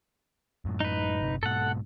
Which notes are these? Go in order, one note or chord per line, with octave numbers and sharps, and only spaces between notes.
F#2 A2
D#4 B4
G1 C3
G#2 B2 A4 F#5